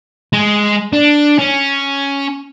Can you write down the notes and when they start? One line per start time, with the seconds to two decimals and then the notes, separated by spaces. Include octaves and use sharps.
0.33 G#3
0.93 D4
1.39 C#4